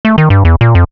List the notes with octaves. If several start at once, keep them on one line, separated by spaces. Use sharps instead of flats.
A3
D#3
G2
E2
A#2
F2